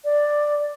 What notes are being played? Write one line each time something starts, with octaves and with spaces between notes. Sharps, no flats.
D5